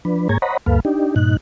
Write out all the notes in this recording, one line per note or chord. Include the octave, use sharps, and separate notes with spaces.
F3 D4 B4
G#2 A#3 G#4 C#5 A#5 G#6
C5 C#5 D#5 F#5 A#5 B5
D2 G2 A#3 A4 B4 F5
D4 D#4 G4
G2 A#2 D#4 F#6